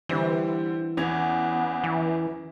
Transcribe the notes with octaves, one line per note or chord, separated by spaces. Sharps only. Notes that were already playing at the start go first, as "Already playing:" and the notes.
D3 E3 G3 C4
E2 B3 C#4 G#6 F7
E3